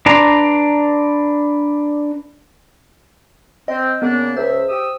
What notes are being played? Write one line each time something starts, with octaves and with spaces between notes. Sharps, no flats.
D4 B4 D5 A#5 C6
C4 D#5
C#3 A#3 B3 D4
C#2 C5 E5
G4 D#6 E6